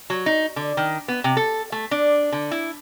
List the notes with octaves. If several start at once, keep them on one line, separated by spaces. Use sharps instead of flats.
F#3
D#4
D3
D#3
B3
C3
A4
A3
D4
D3
E4